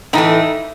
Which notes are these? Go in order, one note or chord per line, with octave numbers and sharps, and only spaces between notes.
A2 E3 A3 D#4